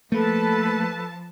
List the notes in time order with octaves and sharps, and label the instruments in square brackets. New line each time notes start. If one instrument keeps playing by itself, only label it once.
[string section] F3 A5 [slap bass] A3 A#3 [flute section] A4 B4